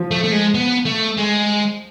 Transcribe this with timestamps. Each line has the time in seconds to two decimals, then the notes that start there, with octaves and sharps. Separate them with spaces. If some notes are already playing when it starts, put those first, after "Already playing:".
Already playing: F3
0.11 A3
0.24 A3
0.32 G#3
0.54 B3
0.86 A3
1.18 G#3